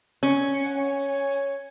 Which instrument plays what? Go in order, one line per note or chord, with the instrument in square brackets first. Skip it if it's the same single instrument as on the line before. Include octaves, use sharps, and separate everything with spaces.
[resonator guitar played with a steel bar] C#4
[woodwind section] C#5 F#5
C#5